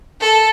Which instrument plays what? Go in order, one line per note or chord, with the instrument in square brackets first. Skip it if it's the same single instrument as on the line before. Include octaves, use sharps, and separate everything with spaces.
[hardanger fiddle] A4